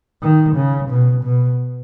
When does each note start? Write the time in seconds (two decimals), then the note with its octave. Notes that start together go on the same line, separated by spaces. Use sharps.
0.22 D#3
0.56 C#3
0.89 B2
1.23 B2